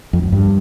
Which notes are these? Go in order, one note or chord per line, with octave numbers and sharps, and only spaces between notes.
F2
F#2
G2